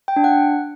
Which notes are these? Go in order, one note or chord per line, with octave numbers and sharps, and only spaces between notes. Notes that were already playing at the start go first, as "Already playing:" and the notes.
G5
D4
F#5